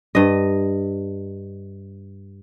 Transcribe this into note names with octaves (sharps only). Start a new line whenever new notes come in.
G2 D#5